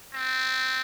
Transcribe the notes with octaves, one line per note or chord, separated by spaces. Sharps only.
C4